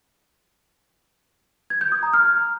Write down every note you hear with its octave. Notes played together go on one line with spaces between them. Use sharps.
G#6
G6
D#6
A#5
F6